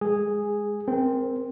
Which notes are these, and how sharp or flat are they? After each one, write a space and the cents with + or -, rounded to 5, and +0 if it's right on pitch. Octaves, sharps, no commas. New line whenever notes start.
G#3 -10 G#4 -5
C4 +0 A#4 +15